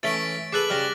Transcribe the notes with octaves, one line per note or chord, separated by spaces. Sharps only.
E3 A3 C#4 A6 B6 D7
G#4 A4 B4 D6 F#6 F#7
C#3 G3 F6 A#6